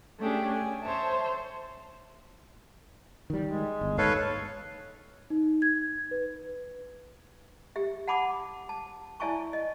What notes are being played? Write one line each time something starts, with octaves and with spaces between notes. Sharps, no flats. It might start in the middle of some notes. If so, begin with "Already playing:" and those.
A3 C#4 D4 G4 G#4
G#5
C5 C#5 E5 A5
D#3 G3
G#3
G1
D#2 G#2 A4 B4 C#5 F5
D#4
G#6
B4
G4 E5
F#5 A5 B5 D6 D#6
A5
E4 D5 E5 G#5 A5 C#6
D#5